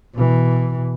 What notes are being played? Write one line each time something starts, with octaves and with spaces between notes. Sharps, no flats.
B2 E3